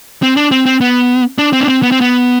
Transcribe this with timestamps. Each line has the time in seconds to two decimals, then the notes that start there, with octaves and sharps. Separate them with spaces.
0.23 C4
0.37 D4
0.51 C4
0.66 C4
0.81 B3
1.38 D4
1.53 C4
1.61 D4
1.68 C4
1.83 B3
1.92 C4
2.01 B3